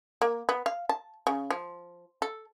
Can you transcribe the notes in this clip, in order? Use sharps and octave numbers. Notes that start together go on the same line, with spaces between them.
A#3
B3
F5
A5
C#3
F3
A4